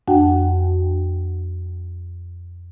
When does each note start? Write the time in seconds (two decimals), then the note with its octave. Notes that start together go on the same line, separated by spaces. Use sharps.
0.08 F2 D4 F#4 F#5 G5